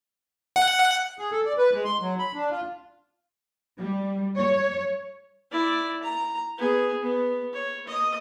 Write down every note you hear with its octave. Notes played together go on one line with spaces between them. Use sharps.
F#5
G#4
A4
D5
B4
G#3
C6
F#3
B5
D4
F4
G3
C#5
E4 D5
A#5
B3 G#4
B3
C#5
D#5 D#6